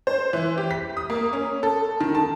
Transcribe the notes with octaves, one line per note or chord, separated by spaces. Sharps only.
C5
E3
G4
B6
D#6
A#3
C#4
A4
D#3
A5